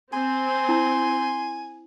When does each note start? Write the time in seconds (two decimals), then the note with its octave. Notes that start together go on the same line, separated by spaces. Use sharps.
0.13 C4 G#5 C6
0.69 E4